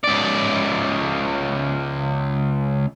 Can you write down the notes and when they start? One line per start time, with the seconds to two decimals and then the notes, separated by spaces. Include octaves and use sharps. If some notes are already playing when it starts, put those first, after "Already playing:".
0.04 C#2 D5